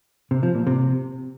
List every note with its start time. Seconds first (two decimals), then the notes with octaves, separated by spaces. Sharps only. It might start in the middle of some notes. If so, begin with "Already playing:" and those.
0.31 C3
0.43 F3
0.55 A#2
0.67 C3